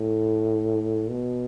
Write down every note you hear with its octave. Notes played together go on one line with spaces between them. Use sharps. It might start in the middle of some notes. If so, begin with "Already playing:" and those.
Already playing: A2
B2